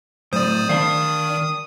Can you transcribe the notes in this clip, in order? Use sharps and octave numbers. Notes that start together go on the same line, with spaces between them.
A2 F#3 C5 D5 D#6
D#3 D4 F5